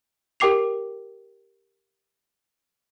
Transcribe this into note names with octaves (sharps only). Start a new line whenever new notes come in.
G4 A#4 G5 D6 C7 F7